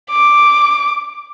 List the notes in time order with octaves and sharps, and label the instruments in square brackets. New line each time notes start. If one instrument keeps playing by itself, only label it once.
[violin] D6